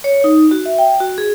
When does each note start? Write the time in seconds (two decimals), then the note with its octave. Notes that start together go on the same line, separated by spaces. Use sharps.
0.04 C#5
0.24 D#4
0.51 F#4
0.66 E5
0.78 G5
1.00 F#4
1.18 G#4